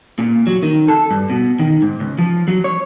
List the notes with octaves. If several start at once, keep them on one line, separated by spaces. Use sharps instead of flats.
A#2
F#3
D#3
A4
G2
B2
D#3
G#2
C#2
F3
F#3
C#5